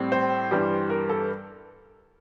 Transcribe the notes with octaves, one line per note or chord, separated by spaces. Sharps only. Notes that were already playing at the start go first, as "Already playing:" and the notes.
Already playing: A2 G3 C4
C5
G2 E3 G3
A#4
A4